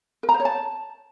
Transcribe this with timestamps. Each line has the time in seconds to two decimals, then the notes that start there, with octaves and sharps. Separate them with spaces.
0.23 A#4
0.29 A#5
0.34 C5
0.40 C#5
0.45 A5